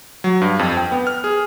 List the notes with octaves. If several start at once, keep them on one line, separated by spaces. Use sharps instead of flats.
F#3
G2
F2
G5
B3
F6
G#4